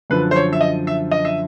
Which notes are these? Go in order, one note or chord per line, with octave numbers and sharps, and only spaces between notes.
F#2 D3 F3 B4
C5
C#5
E5
D#5
E5
D#5
E5